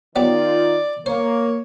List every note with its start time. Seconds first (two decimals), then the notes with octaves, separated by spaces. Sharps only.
0.16 D#3 F#3 G3 B3 D#4 F4 D5
1.06 A#3 C5 C#5